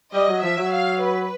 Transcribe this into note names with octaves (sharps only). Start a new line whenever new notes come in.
G3 D#5
F#3
F3 E5
F#3
F5
B4